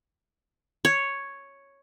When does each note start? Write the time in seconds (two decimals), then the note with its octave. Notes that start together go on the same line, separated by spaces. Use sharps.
0.85 C#5